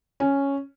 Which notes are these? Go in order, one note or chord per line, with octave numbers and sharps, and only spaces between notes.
C#4